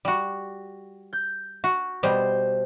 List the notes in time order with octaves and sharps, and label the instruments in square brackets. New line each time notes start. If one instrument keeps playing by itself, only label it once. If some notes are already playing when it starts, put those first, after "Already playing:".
[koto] G3 F#4
[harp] G6
[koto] F#4
[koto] B2 G3 [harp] C5